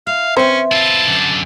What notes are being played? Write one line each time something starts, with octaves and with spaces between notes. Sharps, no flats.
E4 F5
E3 C4 C#4 C5 E5
E4 F4 A5
F#2 D3